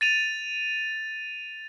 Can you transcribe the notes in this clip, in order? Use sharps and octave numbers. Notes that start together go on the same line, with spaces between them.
A6 D#7 F7